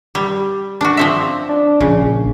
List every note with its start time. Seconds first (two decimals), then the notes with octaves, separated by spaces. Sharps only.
0.15 G3
0.81 D4 F#4
0.97 F3 C4 E5
1.49 D4
1.81 A#1 C#3